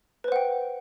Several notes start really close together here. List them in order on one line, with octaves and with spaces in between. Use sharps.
B4 C5 F#5 G5